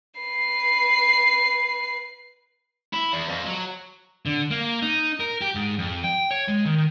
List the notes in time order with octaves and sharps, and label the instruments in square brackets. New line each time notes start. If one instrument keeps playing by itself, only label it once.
[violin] B4 C7
[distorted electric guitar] E4
E2
F2
F#3
D3
A#3
D#4
A#4
G4
G#2
F2
G5
C#5
G#3
D#3